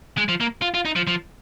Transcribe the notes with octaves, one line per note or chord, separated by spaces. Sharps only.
G#3
F3
A#3
F4
F4
D#4
F3
F3